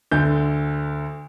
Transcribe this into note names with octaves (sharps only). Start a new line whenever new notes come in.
D2 D3 G6